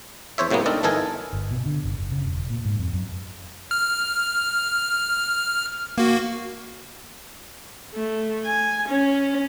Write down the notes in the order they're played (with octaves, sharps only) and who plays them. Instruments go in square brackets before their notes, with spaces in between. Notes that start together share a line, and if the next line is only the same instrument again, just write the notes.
[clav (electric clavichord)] E2 C5 C#5 E5
A2 C3 F#3 A#3 B3
C4 D4 D#4 A4 A#4 D5
G1 E3 D#4 A4 A#4 G#5
[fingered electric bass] G1
B2
D3
F#1
F#1
C#3
E1
A#2
G#2
F2
F#2
[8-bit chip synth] F6
A#3 F#4
[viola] A3
G#5
C#4